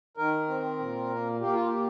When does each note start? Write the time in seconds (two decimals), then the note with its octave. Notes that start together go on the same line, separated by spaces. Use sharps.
0.17 D#3 A#4
0.48 C4
0.79 A#2
1.10 A#3
1.41 A#3 G4
1.54 F4
1.67 A#2 G4